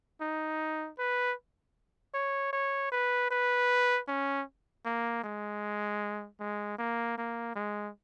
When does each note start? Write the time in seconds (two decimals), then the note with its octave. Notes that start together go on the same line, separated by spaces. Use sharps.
0.21 D#4
0.98 B4
2.14 C#5
2.53 C#5
2.92 B4
3.30 B4
4.08 C#4
4.85 A#3
5.24 G#3
6.40 G#3
6.78 A#3
7.18 A#3
7.55 G#3